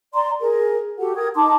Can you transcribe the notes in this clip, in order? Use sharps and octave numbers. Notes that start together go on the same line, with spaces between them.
D5 A#5 C6
G#4 A#4
F#4 G4 A4 F#5
A#4 G5 D#6 G#6
D#4 A5 C6 D6